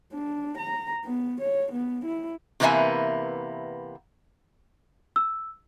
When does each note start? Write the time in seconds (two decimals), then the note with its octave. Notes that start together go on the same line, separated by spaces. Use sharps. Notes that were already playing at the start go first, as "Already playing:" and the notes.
0.13 D4
0.58 A#5
1.05 B3
1.41 C#5
1.73 B3
2.05 E4
2.60 C3 E3 A#3 B3 E5 G#5
5.16 E6